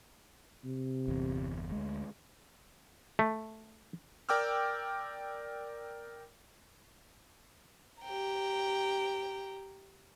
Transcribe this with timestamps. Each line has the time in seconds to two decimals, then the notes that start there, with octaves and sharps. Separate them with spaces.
0.65 C3
1.08 G1 E2
1.71 D2 G#3
3.19 A3
4.29 A#4 D5 G5 D6 E6 F6
8.02 G4 G5 A#5